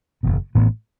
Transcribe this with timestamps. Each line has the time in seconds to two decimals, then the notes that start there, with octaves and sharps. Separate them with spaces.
0.23 F#1 E2 B2
0.55 A1 A2 E3 B3